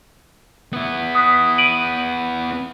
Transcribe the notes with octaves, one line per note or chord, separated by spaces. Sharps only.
B3 E4
D#6 F#6 B6
D7 D#7 F#7